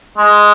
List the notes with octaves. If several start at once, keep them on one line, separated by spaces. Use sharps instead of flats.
G#3